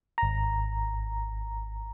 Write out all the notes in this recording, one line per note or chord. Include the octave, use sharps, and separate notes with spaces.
G#1 A#5